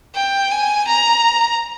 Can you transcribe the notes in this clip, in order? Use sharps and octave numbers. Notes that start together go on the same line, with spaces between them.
G5
G#5
A#5